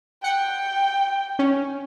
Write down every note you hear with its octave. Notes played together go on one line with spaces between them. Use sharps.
F#5 G5 C#7
C#4